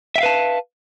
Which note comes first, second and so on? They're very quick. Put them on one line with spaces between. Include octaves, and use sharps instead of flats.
E5 G5 F5 B4 A5